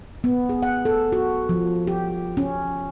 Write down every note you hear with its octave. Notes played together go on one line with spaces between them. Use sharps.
B3
G#4
F#5
A4
F#4
F3
G4
C#4